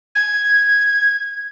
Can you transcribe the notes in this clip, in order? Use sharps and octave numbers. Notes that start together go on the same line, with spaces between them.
G#6